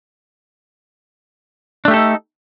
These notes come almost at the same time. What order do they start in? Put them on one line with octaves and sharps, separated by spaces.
D4 A3 G4 A4 D#4